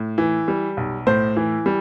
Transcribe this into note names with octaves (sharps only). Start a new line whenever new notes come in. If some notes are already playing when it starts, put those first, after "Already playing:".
Already playing: A2
E3
G3
B1
A2 C5
E3
G3